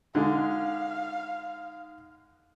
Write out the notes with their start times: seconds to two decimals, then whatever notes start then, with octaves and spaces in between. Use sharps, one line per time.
0.15 D3 G#3 D#4 F5